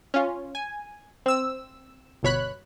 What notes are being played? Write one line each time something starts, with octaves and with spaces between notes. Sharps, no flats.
C#4 F4
G#5
C4 E6
G1 B2 C#5 B5 F#6